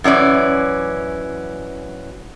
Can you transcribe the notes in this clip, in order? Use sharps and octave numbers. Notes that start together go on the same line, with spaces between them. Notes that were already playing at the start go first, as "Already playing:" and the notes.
F#2 E3 C#4 D5